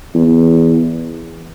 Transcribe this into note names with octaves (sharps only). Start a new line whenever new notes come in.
E2